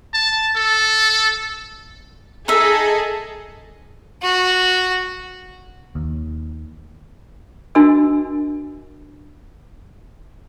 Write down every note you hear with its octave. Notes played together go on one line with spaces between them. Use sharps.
A5
A4
D#4 G#4 A4 D#5 E5
F#4
D#2
D4 F#4 A#4 D#5 G#5 E6